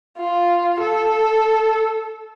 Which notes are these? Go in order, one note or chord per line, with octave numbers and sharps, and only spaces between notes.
F4
A4